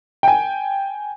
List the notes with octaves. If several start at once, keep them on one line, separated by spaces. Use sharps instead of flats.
G5 G#5